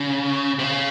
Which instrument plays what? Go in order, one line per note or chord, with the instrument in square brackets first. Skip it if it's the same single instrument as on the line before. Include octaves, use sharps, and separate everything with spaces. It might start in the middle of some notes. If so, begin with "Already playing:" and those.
Already playing: [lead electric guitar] C#3
C3
C#3